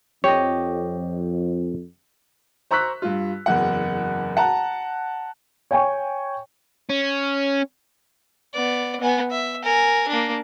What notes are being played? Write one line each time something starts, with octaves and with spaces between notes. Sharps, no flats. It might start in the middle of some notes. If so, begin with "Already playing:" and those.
F2 G4 C#5 D#5
C5 A#5 C#6 E6 F#6 B6
G2 F4
F#1 E2 F#5
F#5 A5 A#5
C#5 G5 G#5 C#6
C#4
B3 D5
B3 G#5
E5
A#4 G#5
A#3 D4